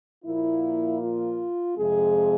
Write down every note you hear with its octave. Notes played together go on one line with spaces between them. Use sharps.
A#2 F3 A#3 E4
F4
F2 C3 F3 G#3 C4 G#4